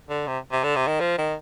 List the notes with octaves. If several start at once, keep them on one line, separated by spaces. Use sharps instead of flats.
D3
C3
C3
D3
C3
D#3
F3
D#3